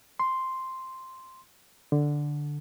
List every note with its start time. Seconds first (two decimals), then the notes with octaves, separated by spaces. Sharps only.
0.20 C6
1.92 D3